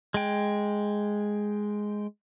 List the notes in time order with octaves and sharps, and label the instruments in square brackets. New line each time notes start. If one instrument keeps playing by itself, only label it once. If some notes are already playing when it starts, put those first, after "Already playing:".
[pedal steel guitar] G#3 G5